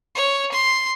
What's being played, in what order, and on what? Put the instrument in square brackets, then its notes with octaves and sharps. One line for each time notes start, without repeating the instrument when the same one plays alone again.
[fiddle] C#5
C6